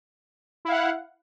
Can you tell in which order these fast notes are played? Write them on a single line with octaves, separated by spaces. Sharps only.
E4 F5 F#5